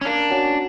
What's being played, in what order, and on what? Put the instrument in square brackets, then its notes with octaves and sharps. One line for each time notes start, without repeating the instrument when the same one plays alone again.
[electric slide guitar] C#4
[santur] A#3 [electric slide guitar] D4
[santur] C#4 F#4